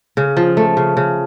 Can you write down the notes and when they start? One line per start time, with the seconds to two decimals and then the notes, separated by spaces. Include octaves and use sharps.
0.17 C#3
0.37 F3
0.57 A3
0.77 C#3
0.97 C#3